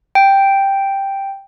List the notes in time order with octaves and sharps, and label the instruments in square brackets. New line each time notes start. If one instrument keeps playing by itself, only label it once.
[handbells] G5